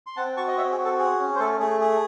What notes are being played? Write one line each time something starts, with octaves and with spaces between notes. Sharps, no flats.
C6
C4 F#5 A5
F#4 A5 C#6
D#5
C4 C#5 E5
G#4
F#4
A4
G#4
C#4
C5
A3 A4
A3 G#4
G#4